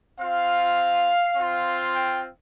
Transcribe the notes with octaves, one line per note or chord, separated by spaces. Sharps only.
C4 F4 F5
C4 F4
G5